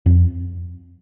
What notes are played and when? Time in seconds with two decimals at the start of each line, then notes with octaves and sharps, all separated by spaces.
0.06 F2